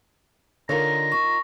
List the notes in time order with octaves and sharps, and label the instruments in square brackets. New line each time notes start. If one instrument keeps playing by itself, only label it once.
[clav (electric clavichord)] D3 C#5 [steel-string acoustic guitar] D#4 F4 A#4 [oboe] A#5
[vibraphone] C#6